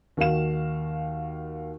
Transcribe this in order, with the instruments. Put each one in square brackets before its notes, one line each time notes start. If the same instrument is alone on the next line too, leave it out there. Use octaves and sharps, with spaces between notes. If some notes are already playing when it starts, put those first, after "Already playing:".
[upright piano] D#2 D#3 F#4 F5 E7